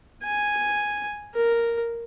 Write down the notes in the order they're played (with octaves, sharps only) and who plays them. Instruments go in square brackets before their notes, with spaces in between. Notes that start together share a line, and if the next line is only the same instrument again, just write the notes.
[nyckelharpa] G#5
A#4